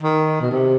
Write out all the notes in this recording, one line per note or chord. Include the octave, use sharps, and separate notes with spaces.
D#3
B2
C3